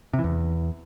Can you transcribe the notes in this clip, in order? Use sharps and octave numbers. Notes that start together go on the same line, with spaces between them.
C3
E3
E2